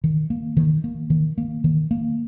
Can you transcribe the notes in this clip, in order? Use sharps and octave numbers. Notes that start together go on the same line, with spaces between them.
D#3
A#3
D#3
A#3
D#3
A#3
D#3
A#3